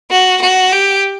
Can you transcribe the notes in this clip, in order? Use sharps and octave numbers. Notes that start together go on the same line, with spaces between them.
F#4
F#4
G4